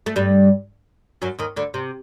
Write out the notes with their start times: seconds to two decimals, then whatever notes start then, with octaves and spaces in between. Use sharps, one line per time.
0.06 A3
0.16 G2 G3
1.22 F#2 F#3
1.39 D#2 D#3
1.56 D2 D3
1.74 C3